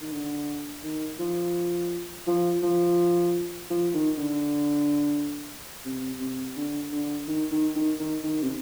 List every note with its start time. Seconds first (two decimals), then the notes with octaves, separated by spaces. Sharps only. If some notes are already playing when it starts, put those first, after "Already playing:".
0.01 D#3
0.12 D3
0.83 D#3
1.19 F3
2.27 F3
2.62 F3
3.70 F3
3.94 D#3
4.18 D3
5.85 C3
6.20 C3
6.56 D3
6.92 D3
7.28 D#3
7.52 D#3
7.76 D#3
8.00 D#3
8.23 D#3
8.43 C3